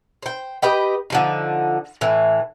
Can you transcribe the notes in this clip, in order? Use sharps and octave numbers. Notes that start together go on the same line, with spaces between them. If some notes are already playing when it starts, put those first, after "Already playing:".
C5 G5
G4 B4 D#5 G5
D3 F3 D#4
A2 E3